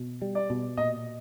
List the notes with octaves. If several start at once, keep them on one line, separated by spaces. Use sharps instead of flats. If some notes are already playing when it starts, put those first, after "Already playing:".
Already playing: B2
G3
D5
B2
A#2 D#5